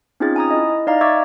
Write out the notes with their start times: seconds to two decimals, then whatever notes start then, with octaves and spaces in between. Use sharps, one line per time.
0.20 C4 C#4 D#4 F4 G#4 A6
0.36 G#5 A#5 D#6
0.51 E4 D#5
0.70 D#5
0.87 D#4 D5 D#5 F5 A#5
1.01 E5 C#6 D6 E6 G#6 A6